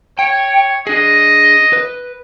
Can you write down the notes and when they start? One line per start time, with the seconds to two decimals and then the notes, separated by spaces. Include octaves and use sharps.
0.19 C#5 G5
0.87 D4 G#4 D#5
1.73 B4